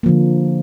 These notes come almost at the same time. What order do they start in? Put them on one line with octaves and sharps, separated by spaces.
A#3 F3 D3